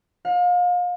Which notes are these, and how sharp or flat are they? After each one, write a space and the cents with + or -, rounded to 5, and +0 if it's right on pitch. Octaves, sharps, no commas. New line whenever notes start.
F5 +35